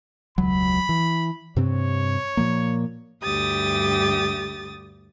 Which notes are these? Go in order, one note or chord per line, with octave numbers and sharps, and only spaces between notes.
E1 C#2 F#3 B5
E3
G2 C3 C4 C#5
A#2 F3 A#3
D2 G2 G4 D#6 A6